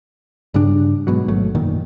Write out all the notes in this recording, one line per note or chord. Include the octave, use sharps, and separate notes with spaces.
G2 C#3 G3 D4
G#2 B2 F#3
G#1 F#3 A3
F1 F#2 A#2 D#3